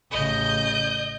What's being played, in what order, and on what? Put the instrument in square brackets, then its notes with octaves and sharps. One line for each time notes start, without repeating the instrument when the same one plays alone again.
[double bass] A1 C#3 [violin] D#5 G6